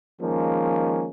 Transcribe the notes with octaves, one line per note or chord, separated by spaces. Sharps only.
D#3 F3 G#3 A#3 C#4